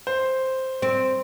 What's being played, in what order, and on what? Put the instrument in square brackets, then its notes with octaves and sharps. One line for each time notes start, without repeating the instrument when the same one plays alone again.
[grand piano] C5
[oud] C4